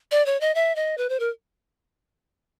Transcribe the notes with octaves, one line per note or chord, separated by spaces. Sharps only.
D5
C#5
D#5
E5
D#5
B4
C5
A#4